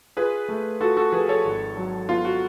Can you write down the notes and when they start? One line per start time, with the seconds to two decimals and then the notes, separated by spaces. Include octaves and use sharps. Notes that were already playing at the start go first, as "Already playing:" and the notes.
0.17 F4 G#4 B4
0.48 A3
0.81 F4 F#4 A4
0.97 F#4 A4
1.12 F3 G#4 B4
1.29 A4 C#5
1.45 G#1
1.77 F#3
2.09 B3 F4
2.25 F#4